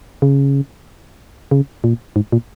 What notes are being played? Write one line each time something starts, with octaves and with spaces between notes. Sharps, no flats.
C#3
C#3
A#2
G#2
A#2